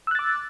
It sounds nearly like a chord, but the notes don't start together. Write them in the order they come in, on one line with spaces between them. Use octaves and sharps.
E6 F#6 A6 D6